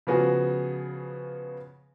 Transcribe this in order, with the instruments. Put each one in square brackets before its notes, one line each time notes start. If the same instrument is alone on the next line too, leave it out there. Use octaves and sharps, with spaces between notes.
[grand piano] C#3 F3 B3 F#4 G#4